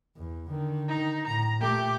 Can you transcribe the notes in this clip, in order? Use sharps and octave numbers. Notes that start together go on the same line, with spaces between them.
E2
D3 D#3
D#4
A2 A#5
A#2 A3 G4 D6